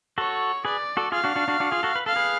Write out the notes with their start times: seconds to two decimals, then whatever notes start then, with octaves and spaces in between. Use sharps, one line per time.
0.18 F#4 A4 C#5
0.65 G#4 B4 D5
0.97 F#4 A4
1.12 F4 G#4 F5
1.24 D4 F#4
1.36 D4 F#4
1.48 D4 F#4
1.60 D4 F#4
1.71 F4 G#4
1.83 F#4 A4
1.96 B4
2.06 A4 F5
2.16 G#4 B4